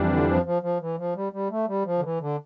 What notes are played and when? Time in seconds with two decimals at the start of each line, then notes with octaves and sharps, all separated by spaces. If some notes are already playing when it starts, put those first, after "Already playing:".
Already playing: F2 E3 G3 D4
0.09 D3
0.27 F3
0.45 F3
0.62 F3
0.80 E3
0.98 F3
1.15 G3
1.32 G3
1.50 A3
1.68 G3
1.85 F3
1.99 D3
2.03 E3
2.21 D3